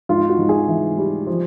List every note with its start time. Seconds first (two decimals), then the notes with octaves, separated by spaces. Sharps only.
0.09 G#2 F4
0.29 F#4
0.39 G#2
0.49 G#4
0.68 E3
0.98 G3
1.27 F3